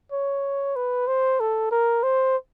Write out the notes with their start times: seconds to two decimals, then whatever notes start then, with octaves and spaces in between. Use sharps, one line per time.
0.12 C#5
0.76 B4
1.07 C5
1.40 A4
1.71 A#4
2.03 C5